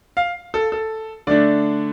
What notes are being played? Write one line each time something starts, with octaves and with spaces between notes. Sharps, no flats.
F5
A4
A4
D3 A3 D4 D5